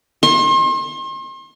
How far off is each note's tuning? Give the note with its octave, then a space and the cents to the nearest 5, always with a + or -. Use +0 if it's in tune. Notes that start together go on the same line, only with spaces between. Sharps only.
C6 +40